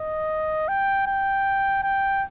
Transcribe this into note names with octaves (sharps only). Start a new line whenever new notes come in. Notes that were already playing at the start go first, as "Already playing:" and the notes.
Already playing: D#5
G5
G5
G5